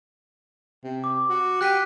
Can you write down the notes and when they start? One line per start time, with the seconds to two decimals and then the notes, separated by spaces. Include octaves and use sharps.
0.84 C3
1.04 D6
1.29 F#4
1.61 G4 F#6 B6 D#7